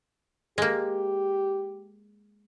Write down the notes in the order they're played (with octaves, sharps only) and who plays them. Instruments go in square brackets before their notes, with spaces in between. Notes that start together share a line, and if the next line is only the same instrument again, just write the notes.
[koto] G#3 A#3 [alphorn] G4